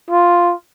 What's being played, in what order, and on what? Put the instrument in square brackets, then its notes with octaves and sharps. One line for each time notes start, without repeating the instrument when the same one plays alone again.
[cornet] F4